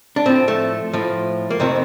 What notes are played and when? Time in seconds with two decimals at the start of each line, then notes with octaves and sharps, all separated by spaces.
0.16 D4
0.26 A2 F3 C4
0.48 A3
0.93 A2 F3
1.50 A#3
1.60 F2 C3 D#3 C4